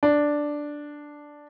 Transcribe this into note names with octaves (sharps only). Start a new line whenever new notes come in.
D4